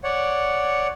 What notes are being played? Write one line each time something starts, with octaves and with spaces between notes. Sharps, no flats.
C#5 D5 F#5